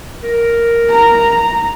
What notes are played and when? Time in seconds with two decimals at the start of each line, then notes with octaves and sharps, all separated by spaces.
0.23 A#4
0.90 A#5